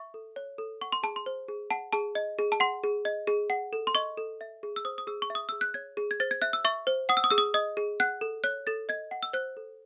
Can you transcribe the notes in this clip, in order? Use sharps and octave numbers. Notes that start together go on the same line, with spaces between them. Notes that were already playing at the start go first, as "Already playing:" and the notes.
Already playing: E5 C#6
A4
C#5
A4
F#5 C#6
C6
G#4 A5
C6
C5
G#4
F#5 A5
G#4 A5
D#5
G#4
A5
F#5 C6
G#4
D#5
G#4
F#5
A4
C6
D#5 C#6
A4
E5
G#4
E6
C5 D#6
D#6
G#4 E6
C#6
E5
D#6
G#4 E6
F#6
C#5 G#6
G#4
G#6
C5 A6
G#6
E5 F#6
E6
E5 C#6
C5
F#5 D#6
E6
D#6
G#4 E6
D#6
D#5 D#6
G#4
F#5 F#6
A4
C#5 F#6
A4 A6
D#5 G#6
F#5
E6
C5 F#6
A4